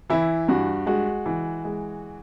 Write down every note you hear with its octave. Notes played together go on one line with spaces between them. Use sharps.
E3 E4
G2 F#4
G#3 F#4
E3
G#3